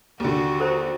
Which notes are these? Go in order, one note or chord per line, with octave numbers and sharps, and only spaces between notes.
D#2 D3 F#4
A4 C5 A#5